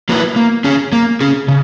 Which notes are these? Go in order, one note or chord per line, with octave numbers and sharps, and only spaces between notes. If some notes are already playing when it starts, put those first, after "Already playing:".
F#3 A#3 E4 B4
A#3
C#4 G#4
A#3
C#4 G#4
C#3